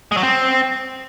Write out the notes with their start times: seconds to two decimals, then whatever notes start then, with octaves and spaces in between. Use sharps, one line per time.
0.12 G#3
0.17 F#3
0.23 C4